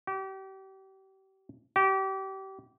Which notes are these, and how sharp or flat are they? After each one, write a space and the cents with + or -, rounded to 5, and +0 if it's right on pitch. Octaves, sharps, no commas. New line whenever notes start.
G4 -35
G4 -30